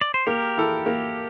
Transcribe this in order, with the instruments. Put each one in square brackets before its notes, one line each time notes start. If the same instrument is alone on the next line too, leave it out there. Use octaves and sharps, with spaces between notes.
[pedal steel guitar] D5
C5
[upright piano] A#3 [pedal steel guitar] G4 A#4
[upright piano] E4 A4
A#3